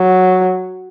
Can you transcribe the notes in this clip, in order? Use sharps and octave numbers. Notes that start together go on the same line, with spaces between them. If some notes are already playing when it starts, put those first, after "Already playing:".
Already playing: F#3